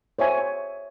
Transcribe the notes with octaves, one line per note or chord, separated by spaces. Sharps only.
C5 C#5 E5 G#5